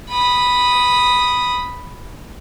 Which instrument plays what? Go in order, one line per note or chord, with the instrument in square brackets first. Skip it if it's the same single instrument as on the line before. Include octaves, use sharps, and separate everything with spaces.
[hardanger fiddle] B5 D#6